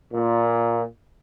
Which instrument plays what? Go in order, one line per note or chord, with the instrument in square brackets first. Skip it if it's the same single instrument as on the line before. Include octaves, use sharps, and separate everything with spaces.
[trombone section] A#2